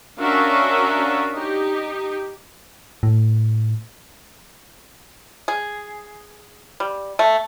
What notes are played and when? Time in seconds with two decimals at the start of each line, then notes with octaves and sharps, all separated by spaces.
0.20 C#4 D4 F#4 A#4 E5 F5
1.33 D#4 G4
3.03 A2
5.48 G#4
6.80 G3
7.19 A3